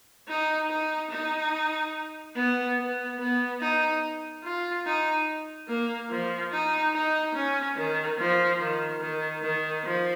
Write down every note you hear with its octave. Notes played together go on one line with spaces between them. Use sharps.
D#4
D#4
D#4
B3
B3
B3
D#4
F4
D#4
A#3
F3
D#4
D#4
C#4
D#3
F3
D#3
D#3
D#3
F3